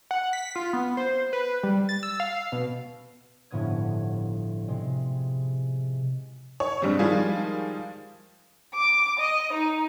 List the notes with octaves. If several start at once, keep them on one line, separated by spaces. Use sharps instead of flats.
F#5
B6
F4
B3
C5
B4
G3
A6
E6
F5
B2
G1 A2 F3 B3 D#6 G#6
C3 G#3
C#5
G2 G3 G#3 C4
D#3 F3 G3 G#3 F4 G#4
D6
D#5
D#4